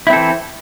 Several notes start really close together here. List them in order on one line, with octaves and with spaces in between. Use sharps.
E4 C4 A4 E3